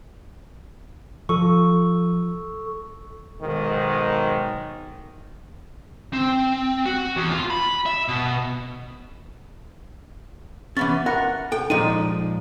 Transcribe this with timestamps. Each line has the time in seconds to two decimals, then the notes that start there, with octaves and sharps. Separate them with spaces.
1.29 F3 A4 C#6
3.41 B1 G#2 D#3
6.13 C4
6.86 F#4
7.16 E2
7.32 F4
7.50 B5
7.86 E5
8.08 B2
10.77 E3 B3 C#4 A6
11.06 A#4 F#5
11.52 A4 G5
11.70 A#2 F3 G#3 D#4 D#7